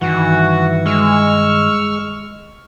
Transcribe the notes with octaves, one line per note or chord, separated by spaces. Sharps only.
G2 D#3 E3 F#4 F#5
G#3 C#6 E6 F6